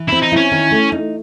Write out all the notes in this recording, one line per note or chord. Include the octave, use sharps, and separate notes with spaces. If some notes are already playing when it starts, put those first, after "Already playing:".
Already playing: E3
C4 E4
D#4
C#4 E4
D#3
A3
D#4